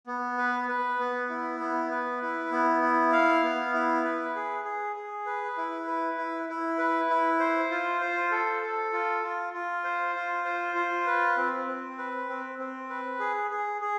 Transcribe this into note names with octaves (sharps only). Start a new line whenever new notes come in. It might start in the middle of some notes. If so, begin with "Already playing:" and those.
B3
B4
B4
B3
E4
B3
B4
E4
B3
E4
F5
B3
E4
B4
G#4
G#4
G#4
B4
E4
B4
E4
E4
B4
E4
C5
F4
C5
A4
A4
F4
F4
F4
C5
F4
C5
F4
B4
C4
C4
B4
C4
C4
B4
G#4
G#4
G#4